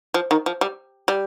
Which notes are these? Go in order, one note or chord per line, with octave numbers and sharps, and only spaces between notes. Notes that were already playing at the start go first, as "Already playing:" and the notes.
F3
D#3
F3
G3
G3